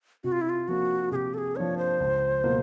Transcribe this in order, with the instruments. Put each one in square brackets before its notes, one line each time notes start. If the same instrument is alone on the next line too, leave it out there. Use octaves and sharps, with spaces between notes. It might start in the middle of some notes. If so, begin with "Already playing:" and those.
[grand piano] C3 [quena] F#4
[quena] F4
E4
F4
[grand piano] F3 A#3 D4 [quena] F#4
[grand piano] C3 [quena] G#4
[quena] G4
A4
G#4
[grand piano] F3 A#3 D4 [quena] C#5
[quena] C5
[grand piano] C#2
B2 F#3 A#3